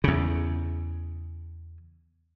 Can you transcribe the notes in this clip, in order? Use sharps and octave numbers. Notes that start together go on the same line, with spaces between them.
E2 C#3